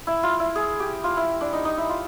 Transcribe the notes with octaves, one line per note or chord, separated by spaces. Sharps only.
E4
F4
E4
G#4
G4
F4
E4
D4
D#4
D#4
E4
F4